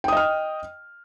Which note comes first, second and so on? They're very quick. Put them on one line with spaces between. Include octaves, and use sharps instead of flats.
G5 D#6 D#5 F6